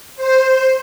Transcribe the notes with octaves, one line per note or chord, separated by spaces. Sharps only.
C5